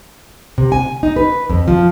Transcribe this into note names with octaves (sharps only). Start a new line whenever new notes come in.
C3
G#5
D#4
B4
F2
F3